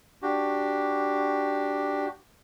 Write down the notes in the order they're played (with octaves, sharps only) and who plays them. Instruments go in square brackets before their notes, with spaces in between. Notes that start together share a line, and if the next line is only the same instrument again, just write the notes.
[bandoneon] D4 F#4 G4